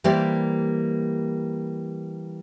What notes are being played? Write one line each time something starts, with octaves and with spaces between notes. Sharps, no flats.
E3 G3 A#3 G4 C5 D5